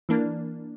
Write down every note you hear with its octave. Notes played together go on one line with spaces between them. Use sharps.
E3 A#3 D4